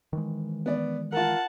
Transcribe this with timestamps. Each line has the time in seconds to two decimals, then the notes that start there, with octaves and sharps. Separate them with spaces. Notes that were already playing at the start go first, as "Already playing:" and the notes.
0.13 D#3 E3 G#3
0.66 B3 D5
1.12 F4 A#4 F#5 A5